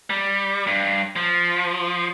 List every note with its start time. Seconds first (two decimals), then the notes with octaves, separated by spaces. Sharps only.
0.10 G3
0.67 G2
1.16 F3